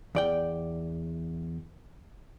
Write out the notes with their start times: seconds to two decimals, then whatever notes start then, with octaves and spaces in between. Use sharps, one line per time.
0.15 E2 D5 G5